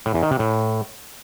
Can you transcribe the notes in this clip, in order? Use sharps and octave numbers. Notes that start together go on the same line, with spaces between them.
A2
E2
D#3
C3
A2